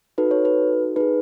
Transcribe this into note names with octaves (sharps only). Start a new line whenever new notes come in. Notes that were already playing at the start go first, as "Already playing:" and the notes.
D#4 F#4 A4 B4
C#5
B4
D#4 G#4 B4